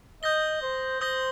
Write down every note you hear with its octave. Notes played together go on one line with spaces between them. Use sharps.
D#5 D#6 G6 A#6 G7
C5
C5 D#6 G6 A#6 G7